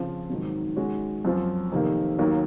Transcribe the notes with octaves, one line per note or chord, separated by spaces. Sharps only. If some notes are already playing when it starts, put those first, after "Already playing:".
Already playing: C#3 F3 C4 F4
G#2 D#3 F#3 C4
D#3 G#3 C#4 F#4
F#2 F3 C4 F4
F2 C3 D#3 A#3
D#2 D#3 F#3 A#3